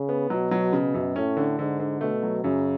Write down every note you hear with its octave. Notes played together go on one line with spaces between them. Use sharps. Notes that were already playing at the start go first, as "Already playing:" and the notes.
Already playing: C#3
B3
B2 F#3
F#3
C#3
F#2
A2 C#4
D3
G#2 D3
D3
B2 A3
F#3
F#2 C#3